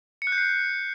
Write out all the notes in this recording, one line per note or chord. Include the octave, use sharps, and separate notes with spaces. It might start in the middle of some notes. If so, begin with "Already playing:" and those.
C#7
F#6
G6
C7
G6